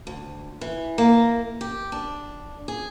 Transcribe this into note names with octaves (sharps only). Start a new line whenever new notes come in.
D2
E3
A#3
G4
D4
G#4